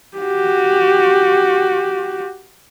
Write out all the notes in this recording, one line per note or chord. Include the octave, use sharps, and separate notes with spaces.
F#4 G4